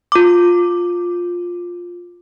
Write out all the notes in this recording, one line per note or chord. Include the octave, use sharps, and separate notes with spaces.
F4 D6